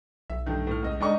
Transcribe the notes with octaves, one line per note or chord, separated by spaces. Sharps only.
B1 E5
G2 D#3 A3
A2 F6
C#2 D#5
G#3 D4 D#4 C#6